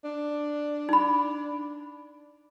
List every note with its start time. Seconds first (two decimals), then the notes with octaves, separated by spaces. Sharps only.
0.04 D4
0.89 D#4 B5